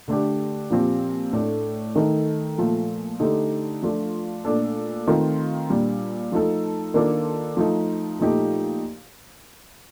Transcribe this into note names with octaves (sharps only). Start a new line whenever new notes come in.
D3 A3 D4 G4
A#2 F3 C4 G4
A2 A3 D4 A4
D#3 A3 D#4 A4
A#2 F3 A3
D3 A3 D#4 G4
F3 A3 D4 F4
A#2 A3 D4 A4
D#3 A3 C4 F4
A#2 G3 D4
F3 A3 D#4 A4
D#3 A#3 D4 F4 A4
F3 A3 D#4
A#2 F3 A3 D#4 G4